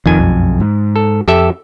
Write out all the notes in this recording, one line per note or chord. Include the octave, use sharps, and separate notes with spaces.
D#1 F2 D#3 G#5
B1 F#2
G#2
A4
F2 G4 A4 E5